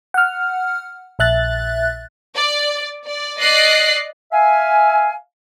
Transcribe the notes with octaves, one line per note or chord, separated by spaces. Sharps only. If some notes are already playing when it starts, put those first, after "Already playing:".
F#5 F6
A#1 E5 F#6 A6
D5
D5
D5 D#5 F#6 C7
E5 F5 G#5